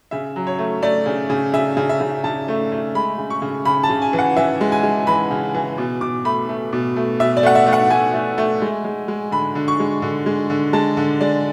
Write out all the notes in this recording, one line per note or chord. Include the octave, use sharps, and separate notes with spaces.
C#3 E5
F#3
C#5
A3
A3 D5
C#3
C#3
C#3 E5
C#3
E5
C#3
C#3 A5
A3
A3
G#3 B5
C#3
C#6
C#3
C#3 B5
A5
C#3
G#5
E3
F#5
E3 E5
G#3
G#5
G#3
E3 B5
C#3
E3
B2
B2 D6
A3 B5
A3
B2
A3
B2 E5
D5
A3 F#5
E5
A3
F#5
A3 G#5
A3
A3
G#3
G#3
G#3
D3 B5
D3
C#6
G#3
D3
G#3
D3
G#3 A5
D3
G#3 D5